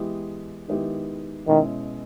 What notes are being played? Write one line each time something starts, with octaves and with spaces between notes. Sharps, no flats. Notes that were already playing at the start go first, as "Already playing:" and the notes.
Already playing: E3 G#3 B3 E4 G4
D#3 G#3 B3 E4 G4
B2 D#3 G#3 C#4 E4